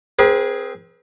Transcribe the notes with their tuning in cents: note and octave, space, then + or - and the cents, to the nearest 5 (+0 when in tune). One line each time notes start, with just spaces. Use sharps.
C4 +0 G#4 +0 B4 -45